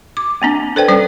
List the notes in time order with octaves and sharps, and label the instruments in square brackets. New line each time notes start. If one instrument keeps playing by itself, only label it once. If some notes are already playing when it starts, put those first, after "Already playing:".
[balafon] D6
A#3 C4 D4
A4 B4 C5 D5 G5
G3 C#4 C5 D5